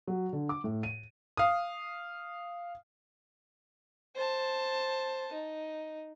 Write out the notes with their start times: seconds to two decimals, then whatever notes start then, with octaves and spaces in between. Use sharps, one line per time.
0.07 F#3
0.33 D3
0.49 D6
0.64 A2
0.83 D#7
1.37 F5 D#6
4.16 C5 A5
5.33 D#4